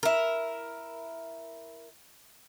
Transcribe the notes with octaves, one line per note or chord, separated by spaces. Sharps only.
E4 A#4